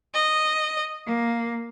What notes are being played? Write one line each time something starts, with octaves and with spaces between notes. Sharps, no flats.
D#5
A#3